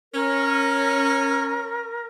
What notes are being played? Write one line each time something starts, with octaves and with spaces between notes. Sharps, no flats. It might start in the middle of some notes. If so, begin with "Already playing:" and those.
C#4 A#4